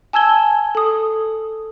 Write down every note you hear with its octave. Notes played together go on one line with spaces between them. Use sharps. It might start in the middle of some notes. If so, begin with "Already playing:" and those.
G#5 A5 E6 G#6 G7
A4 D#6